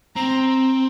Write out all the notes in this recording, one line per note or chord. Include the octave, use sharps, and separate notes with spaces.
C4 A#5